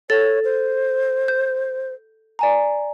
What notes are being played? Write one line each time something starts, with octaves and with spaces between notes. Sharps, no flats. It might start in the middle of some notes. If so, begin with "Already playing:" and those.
A4 C#5 A6
C5
G6
D5 G#5 A#5